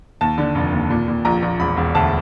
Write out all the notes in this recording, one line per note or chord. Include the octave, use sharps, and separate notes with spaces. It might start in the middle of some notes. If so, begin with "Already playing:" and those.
D#2 A5
D3
F1
D#2
A#2
A#2
A#1 A#5
A#1
E1 B5
E1
D2 A5